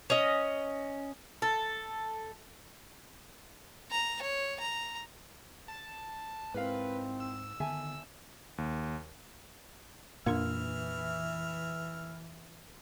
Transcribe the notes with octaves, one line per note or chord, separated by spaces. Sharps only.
C#4 D#5
A4
A#5
C#5
A#5
A5
G#2 C4 E4 A#4 B4 F5
E6
D3 D#3 B3 E5 G#5 A5
D#2
F2 A#2 E3 A#3 D4 A#4 E5 F6